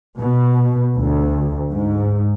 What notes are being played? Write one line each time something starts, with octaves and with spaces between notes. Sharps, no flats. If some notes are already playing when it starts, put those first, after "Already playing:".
B2
D2
G#2